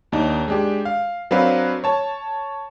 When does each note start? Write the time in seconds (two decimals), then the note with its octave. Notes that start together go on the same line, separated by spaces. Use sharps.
0.12 D#2 D4 D#4
0.48 G#3 D4 G4
0.85 F5
1.31 F#3 C4 D4 A#4 B4 F5
1.84 C#5 A5